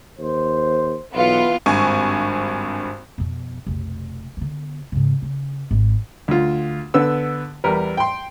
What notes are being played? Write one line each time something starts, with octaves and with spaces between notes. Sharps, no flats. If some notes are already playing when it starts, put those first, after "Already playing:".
D#2 C5
B1 E3 B3 F4 B4
G#1 G2 C4 G#5 C#6
F2 B2
F1 B1
D3 B3
G#2 C#3
C#3
G#1
D2 F4
D3 B3 E6
E2 G3 A#4 B4
G5 C6